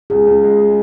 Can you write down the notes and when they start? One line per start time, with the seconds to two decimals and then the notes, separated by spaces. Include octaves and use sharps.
0.10 C#2 G#4
0.27 C#2
0.43 G#3